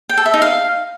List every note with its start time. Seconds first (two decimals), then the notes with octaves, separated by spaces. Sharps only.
0.09 G5
0.18 A4
0.26 E5
0.34 D#4
0.42 F5